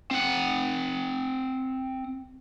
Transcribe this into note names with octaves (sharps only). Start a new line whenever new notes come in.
C4 F#5